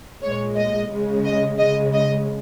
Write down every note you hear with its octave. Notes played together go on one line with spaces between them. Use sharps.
A#2 G#3 C#5
D#5
C#3 G#3
D#5
C#3 G#3 D#5
D#5